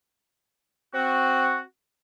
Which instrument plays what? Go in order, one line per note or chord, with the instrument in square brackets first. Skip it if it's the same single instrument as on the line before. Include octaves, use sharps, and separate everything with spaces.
[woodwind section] C4 F#4